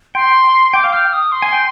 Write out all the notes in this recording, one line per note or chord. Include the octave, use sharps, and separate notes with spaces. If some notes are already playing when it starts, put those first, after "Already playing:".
G5 C6
G5 D6
F5
G5 F6
D#6
C6
G#5
G5